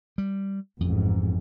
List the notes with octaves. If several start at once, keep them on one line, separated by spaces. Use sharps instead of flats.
G3
A1 F2 G#2